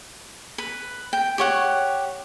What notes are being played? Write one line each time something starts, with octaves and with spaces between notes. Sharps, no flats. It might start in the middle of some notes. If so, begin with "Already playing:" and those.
B4
G5
G4 C#5 F#5